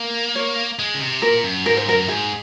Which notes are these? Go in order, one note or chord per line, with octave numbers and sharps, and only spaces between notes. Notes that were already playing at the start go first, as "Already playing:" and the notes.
Already playing: A#3
C#5
G#3
C#3
C3
A#2 A#4
F#2
G#2 A#4
C5
F#2 A#4
G#2 G#4